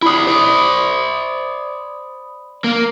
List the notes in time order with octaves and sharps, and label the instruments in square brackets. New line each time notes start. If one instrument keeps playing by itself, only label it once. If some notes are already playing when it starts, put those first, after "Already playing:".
[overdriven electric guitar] E4 D5 [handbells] B5 D#6
[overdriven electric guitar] C5 D5
A#3